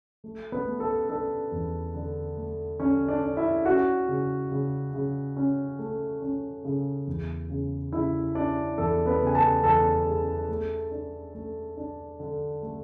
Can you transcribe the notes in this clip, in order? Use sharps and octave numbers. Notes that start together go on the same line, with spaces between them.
A3
B3 B4
A3
A4
D4 A4
E2
D3
A3
D3 C#4 C#5
D4 D5
D4
E4 E5
C#4 F#4 F#5
C#3
C#3
C#3
C#4
A3
C#4
C#3
E2
C#3
C#3 E4 E5
C#4 D4 D5
E2 A4
B3 B4
C#3
G#5
A4 A5
E2 A4 A5
G#3
A3
D4
A3
D4
D3
A3